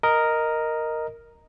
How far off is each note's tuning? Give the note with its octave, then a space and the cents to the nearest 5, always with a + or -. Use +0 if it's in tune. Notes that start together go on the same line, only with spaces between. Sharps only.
A#4 +0 D#5 +0